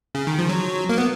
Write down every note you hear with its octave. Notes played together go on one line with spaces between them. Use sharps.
C#3
D#3
F3
F#3
A#3
B3